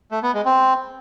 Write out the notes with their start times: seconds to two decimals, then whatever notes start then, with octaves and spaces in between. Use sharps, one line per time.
0.11 A3
0.23 B3
0.34 G#3
0.45 C4